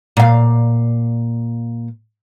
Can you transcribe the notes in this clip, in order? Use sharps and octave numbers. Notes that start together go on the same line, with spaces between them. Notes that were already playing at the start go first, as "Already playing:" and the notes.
A#2 F5